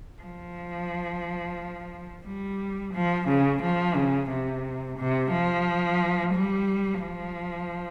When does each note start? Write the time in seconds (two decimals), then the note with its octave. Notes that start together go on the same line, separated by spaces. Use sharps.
0.22 F3
2.26 G3
2.94 F3
3.28 C#3
3.62 F3
3.96 C#3
4.30 C3
4.98 C3
5.32 F3
6.34 G3
7.02 F3